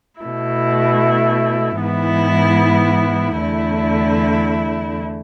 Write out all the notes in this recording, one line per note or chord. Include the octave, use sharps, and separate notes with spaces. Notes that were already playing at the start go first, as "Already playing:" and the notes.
B2 A3 E4
G#2 E3 B3 E4
E2 D3 A3 E4